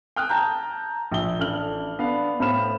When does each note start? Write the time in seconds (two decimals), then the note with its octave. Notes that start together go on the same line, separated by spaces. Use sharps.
0.16 G5 D#6 F6 F#6
0.29 A5 A#5 G6
1.12 A#1 G7
1.39 A1 D4 A4 F6 F#7
1.99 B3 D4 F5
2.40 A2 B3 C5 B5 F6 E7